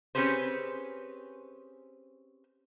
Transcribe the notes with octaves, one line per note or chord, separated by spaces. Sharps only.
C4 C#4 G4 G#4 B4 C5